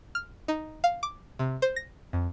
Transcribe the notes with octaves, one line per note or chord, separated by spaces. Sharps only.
F6
D#4
F5
D6
C3
C5
A#6
F2